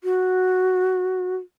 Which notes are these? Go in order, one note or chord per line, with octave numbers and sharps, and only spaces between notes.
F#4